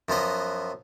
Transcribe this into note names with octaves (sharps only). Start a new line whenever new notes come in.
F#2 F3 B3 D#5